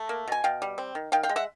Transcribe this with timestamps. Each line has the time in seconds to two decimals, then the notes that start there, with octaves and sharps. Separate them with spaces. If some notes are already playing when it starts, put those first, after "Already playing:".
Already playing: A3
0.09 A#3
0.28 B2 G#5
0.44 B2 F5 G5
0.62 G3
0.78 C4
0.95 D#3
1.12 D#3 F5 G5
1.23 F5 G5
1.29 G#3
1.36 E5 F#5